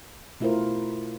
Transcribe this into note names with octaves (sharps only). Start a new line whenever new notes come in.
B2 A3 E4 F4 A#4 C5